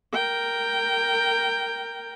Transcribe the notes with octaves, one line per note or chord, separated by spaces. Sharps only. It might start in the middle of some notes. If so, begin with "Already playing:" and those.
A#4 G5